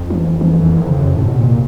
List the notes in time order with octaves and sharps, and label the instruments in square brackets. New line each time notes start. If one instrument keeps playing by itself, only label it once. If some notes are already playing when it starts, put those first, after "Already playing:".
Already playing: [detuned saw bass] F2
[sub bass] F3
E3
E3
[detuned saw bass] F2
[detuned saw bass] E2 [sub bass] D#3
[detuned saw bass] F2
[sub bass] C#3
[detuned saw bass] F#2
[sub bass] C3
[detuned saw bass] A2
B2
A#2